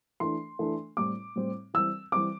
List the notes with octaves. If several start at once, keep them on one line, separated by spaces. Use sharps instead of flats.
E3 A3 D4 C6
E3 A3 D4
A2 G3 C4 D6
A2 G3 C4
E3 G3 C4 E6
E3 G3 C4 D6